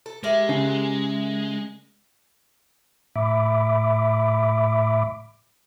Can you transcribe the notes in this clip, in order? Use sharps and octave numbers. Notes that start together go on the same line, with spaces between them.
A4
G#3 G4 A#4 E5
C#3
A2 E5 B5 D6